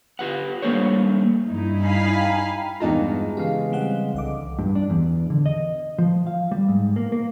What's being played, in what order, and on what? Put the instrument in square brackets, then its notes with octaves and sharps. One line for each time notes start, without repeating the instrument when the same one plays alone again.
[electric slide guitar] F4 G4 B4 F#5
G3 A3 A#3 D4 C5 C#5
[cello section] G2 D#4 E4
[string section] F5 G#5 B5
[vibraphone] G5 A#5
[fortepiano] E2 D#4 F4 [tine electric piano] G2 A5 A#5 [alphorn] G#3
[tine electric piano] C#3 E3 F5 [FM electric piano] G4
[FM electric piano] G3 C4 F#5
[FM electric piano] C2 D#5 D6 [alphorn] D3
[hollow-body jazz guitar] G2
D4
E2
D3
D#5
F3
F5
G3
G#2
A#3
A#3